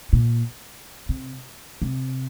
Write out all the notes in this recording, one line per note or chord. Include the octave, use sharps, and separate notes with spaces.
A#2
C3
C3